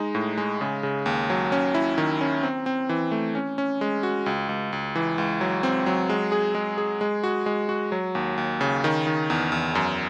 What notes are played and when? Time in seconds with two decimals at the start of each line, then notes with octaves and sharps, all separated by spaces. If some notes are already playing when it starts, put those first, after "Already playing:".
Already playing: G#3 D#4
0.15 A2
0.38 G#3
0.61 C#3
0.83 C#3
1.06 D#2
1.30 F#3
1.52 C#4
1.74 E4
1.98 D#3
2.21 C#4
2.43 C4
2.66 C4
2.89 E3
3.11 A3
3.35 C#4
3.58 C#4
3.81 G#3
4.03 F#4
4.26 C#2
4.49 C#2
4.73 C#2
4.95 E3
5.18 C#2
5.41 F#3
5.63 C4
5.86 F#3
6.09 G#3
6.32 G#4
6.55 G#3
6.78 G#4
7.01 G#3
7.24 F#4
7.46 G#3
7.69 F#4
7.92 F#3
8.15 D#2
8.38 D#2
8.61 C#3
8.84 D#3
9.07 D#3
9.30 E2
9.52 E2
9.75 F#2